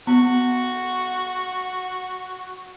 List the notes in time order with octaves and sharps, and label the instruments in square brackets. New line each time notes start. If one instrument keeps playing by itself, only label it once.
[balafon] B3 [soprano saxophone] F#4